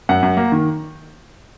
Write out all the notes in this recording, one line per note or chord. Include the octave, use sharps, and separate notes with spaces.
F#2 F#5
F#2
A#3
D#3